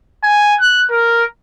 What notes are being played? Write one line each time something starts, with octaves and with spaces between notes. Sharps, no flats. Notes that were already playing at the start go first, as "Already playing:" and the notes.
G#5
F#6
A#4